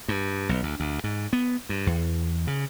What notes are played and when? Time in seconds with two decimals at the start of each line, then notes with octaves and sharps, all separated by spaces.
0.08 G2
0.49 B1
0.63 D2
0.80 D2
1.04 G#2
1.33 B3
1.69 G2
1.87 E2
2.47 C#3